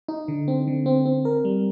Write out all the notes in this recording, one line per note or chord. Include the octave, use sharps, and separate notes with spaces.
D#4
D3
C4
D3
C4
C4
A#4
G3